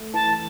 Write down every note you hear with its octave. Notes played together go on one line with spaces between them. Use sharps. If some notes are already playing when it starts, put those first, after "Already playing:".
Already playing: A3
E3 A5